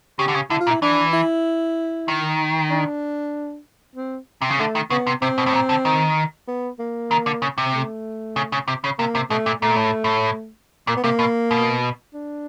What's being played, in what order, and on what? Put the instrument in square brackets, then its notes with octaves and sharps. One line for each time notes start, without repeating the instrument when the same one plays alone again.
[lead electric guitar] C#3 [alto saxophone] G4
[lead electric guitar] D3
C#3
[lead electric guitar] D3 [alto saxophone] E4
[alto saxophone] F4
[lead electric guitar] A#2
[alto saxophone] E4
[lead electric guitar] E3 [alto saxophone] D4
[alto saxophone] E4
[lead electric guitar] D#3
[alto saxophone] D4
C4
[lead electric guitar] C3
C#3
[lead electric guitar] D3 [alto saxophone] A3
[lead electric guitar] D#3
[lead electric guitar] C#3 [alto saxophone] B3
[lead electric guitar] C3
[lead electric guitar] C3 [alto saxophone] C4
[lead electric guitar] B2
A2
A#2
D3
D#3
[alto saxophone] B3
A#3
[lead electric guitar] D#3
D3
C#3
C3
[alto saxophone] A3
[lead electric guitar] C#3
C#3
C3
C#3
[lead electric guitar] C3 [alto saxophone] A#3
[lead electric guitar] C3
[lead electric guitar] B2 [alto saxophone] A3
[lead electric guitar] A#2
[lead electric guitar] A#2 [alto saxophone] A3
[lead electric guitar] A2
A2
[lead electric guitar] A#2 [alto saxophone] A#3
[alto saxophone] B3
[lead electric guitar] C3 [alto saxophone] A#3
[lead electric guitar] B2
B2
[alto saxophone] D4